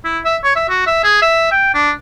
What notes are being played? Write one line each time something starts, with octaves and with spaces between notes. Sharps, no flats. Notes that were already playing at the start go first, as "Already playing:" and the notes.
E4
E5
C#5
E5
F#4
E5
G#4
E5
G5
D4